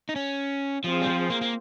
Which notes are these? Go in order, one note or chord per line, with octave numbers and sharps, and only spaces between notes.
D#4
C#4
F3 C4 F4 G#4 C5
G3
F3
A#3
A#3